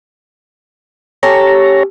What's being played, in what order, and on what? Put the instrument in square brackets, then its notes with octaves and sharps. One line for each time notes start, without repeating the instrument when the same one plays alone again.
[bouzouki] C#4 G4 A4 [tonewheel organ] C#5 A#5